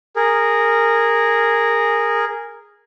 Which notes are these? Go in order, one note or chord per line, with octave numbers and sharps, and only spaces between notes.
G#4 A#4